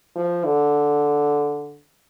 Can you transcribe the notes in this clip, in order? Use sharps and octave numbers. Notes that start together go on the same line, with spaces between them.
F3
D3